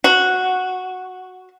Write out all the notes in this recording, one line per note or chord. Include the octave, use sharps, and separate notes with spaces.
F#4